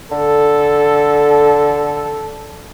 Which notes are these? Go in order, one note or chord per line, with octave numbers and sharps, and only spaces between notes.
D3 A4